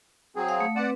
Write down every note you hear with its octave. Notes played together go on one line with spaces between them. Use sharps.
F#3 C4 G#4
F5 F#5 D#6
A3
C4 B4 D5 F#5